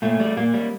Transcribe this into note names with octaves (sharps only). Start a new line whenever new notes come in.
A#2 A3
G3
A#2 A#3
G3